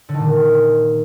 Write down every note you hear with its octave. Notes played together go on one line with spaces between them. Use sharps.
D3
D#3
A#2